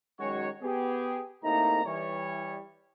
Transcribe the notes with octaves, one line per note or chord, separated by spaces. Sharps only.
D#3 F#3 G#3 C#4 F#4 C#5
B3 G4 G#4
A2 C3 A#3 D#4 A#5
E3 G3 C#5